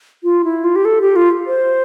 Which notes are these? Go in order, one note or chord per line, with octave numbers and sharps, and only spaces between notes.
F4
E4
F4
G4
A4
G4
F4
C5